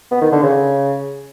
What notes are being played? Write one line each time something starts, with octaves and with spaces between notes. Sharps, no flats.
B3
D#3
D3
C#3